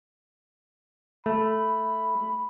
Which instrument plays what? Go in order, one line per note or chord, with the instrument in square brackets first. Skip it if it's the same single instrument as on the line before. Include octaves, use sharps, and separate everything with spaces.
[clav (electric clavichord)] A3 [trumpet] B5